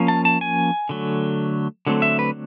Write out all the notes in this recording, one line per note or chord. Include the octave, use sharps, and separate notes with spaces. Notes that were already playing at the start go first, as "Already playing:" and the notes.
Already playing: F3 A#3 C#4
A5
A5
G#5
D3 F#3 A3
D3 F#3 A3 C4
E5
B4